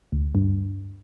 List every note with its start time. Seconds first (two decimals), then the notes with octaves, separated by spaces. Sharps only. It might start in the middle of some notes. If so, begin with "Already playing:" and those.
0.12 D2
0.35 G2